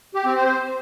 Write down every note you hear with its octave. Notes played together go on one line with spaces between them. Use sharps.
G4
C4
C5